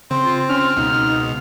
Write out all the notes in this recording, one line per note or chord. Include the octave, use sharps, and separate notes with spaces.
C#3 C4 C6
F4
C#4 F6
C#2 B2 D#4